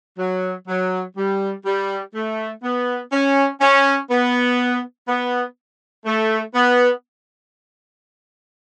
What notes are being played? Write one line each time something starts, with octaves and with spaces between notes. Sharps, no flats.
F#3
F#3
G3
G3
A3
B3
C#4
C#4
B3
B3
A3
B3